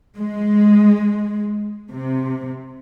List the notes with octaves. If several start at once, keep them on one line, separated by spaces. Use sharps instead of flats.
G#3
C3